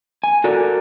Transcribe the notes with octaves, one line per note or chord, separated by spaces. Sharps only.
G#5
F#4 A4 A#4 D5